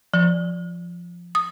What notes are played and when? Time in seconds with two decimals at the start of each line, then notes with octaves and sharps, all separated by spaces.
0.14 F3
1.35 D#6